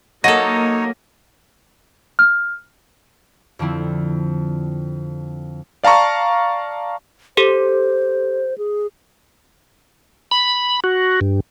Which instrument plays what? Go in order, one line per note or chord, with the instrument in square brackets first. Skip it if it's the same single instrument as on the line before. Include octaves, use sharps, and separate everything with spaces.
[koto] F#3 A4 [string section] A#3 [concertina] D#4 C#5 [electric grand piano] D#5 A#6 D#7
[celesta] F6
[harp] F2 D3 F3 C4 E4
[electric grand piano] D5 F5 A5 A#5 C#6
[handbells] G4 A4 [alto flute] C5
[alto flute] G#4
[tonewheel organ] B5
F#4
G2